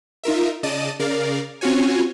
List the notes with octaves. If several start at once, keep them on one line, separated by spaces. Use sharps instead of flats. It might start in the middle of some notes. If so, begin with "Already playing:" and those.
D#4 F4 A#4 E5
C#3 D5 D#5 A5 D#7
C#3 A#4 D5 F5
C4 C#4 F4 F#4 C#5 G#5